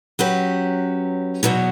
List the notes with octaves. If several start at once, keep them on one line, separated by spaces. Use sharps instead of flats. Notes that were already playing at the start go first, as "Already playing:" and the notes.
F#3 C#4 G4 B4
E2 B2 F#3 B3